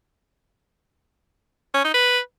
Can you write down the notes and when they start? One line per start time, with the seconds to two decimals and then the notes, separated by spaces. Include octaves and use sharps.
1.74 C#4
1.84 D#4
1.94 B4